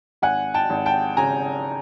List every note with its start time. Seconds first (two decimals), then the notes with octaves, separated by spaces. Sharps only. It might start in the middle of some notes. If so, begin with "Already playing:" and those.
0.22 G#1 F#5 G#5
0.54 G5 A5
0.70 G#1
0.86 G5 A5
1.17 C#3 G#5 A#5